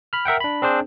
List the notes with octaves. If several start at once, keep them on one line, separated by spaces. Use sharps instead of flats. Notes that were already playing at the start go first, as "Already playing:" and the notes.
B5 F6
A#4 E5 F#5 G5
D4 B5
C4 D4 G#4 C5